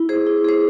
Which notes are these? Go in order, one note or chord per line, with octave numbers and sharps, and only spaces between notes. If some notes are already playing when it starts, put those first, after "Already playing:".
Already playing: E4
G#4 C5
E4
G#4 C5